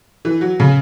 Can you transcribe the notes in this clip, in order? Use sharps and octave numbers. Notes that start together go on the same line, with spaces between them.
E3
F#3
C#3